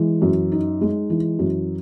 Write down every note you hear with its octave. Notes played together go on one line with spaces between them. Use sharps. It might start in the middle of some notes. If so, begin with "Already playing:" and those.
Already playing: E3 G#3
F#2
D#4
G#3
E3
F#2